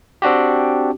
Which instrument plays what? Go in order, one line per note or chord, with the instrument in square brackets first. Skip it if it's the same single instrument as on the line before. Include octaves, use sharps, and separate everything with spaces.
[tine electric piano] C4 D4 F#4 G4